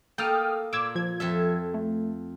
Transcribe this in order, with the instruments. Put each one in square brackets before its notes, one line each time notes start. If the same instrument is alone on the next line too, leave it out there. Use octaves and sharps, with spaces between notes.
[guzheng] A#3 A4 A5 [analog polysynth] G5 D#6 F6
[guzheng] A#2 [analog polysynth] D6 E6 G#6
[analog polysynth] F3 G#6
[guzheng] F2 A4 E5
[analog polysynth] A3